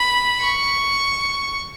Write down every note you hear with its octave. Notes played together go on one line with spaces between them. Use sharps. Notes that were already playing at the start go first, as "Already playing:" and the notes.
Already playing: B5
C#6